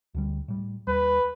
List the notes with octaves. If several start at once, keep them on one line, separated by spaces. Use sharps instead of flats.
D2 D3 G3
A2 G3
D#2 G3 B4